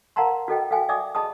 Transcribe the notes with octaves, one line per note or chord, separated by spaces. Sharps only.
A#4 F5 F#5 A5 A#5 C6
F#4 A4 D#5 G5
F#4 A4 F5 G5 G#5
D5 E5 G#5 D6 D#6
G#4 D#5 A5 B5 D#6